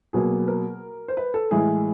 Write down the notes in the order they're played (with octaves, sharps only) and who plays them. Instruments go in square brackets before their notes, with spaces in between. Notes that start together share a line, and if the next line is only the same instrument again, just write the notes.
[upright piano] B2 F#3 A#3 G#4
A#4
C5
B4
A4
A2 E3 G#3 G#4